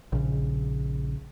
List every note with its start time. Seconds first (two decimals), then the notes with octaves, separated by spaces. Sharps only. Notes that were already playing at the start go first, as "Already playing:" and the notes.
0.12 A#1 C#3